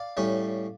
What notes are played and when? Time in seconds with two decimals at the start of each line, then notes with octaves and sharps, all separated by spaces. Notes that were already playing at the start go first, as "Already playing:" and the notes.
Already playing: D5 F5
0.17 A2 G3 C#4